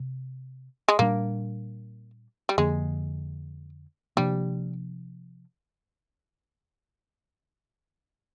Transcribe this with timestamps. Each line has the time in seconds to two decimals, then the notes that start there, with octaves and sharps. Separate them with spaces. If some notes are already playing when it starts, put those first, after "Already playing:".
Already playing: C3
0.88 G#3
0.99 A#2 G3 A#3 D4
2.49 G3
2.58 F2 D3 F3 G#3 A#3
4.17 C3 F3 G3 A#3 D4